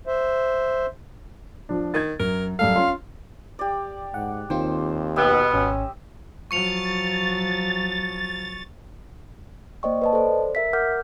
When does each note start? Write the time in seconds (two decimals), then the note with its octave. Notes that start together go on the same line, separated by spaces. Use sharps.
0.07 C5 E5
1.69 F3 D4
1.94 D#3 G#6 A6
2.20 F#2 A#4
2.59 F#2 G3 A4 F5
2.76 C#4 F4 C6
3.59 G4 D5
4.14 G#2 F#5
4.50 D#2 D#3 C4 F4 C5
5.16 B2 B3 G4 D#5 E5
5.53 G#1 C#4
6.51 F3 F#3 C#6 A6 C#7 F7
9.83 A#3 C5 D5 D#5 G5 C#6
10.02 B4 D#5 A5
10.13 A4 C5 D5
10.55 A#4 E5 B6
10.73 A#4 F#5 D6 F6 G6